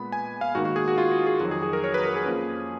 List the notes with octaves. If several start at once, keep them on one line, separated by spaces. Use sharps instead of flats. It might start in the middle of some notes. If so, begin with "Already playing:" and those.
Already playing: A#2 G#3 B3 B5
G#5
F5
G#2 D#3 A#3 F#4
F#4
G#4
F#4
F4
F#4
G#4
F2 D#3 F#3 F#4
G#4
G#4
A#4
C#5
B4
A#4
G#4
F2 F3 A#3 C#4